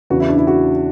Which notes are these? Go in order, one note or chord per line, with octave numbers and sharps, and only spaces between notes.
E2 C#3 E3 F#4
E4
D4
E4
F#4